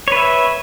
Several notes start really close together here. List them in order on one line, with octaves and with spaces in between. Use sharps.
C#5 B4 E5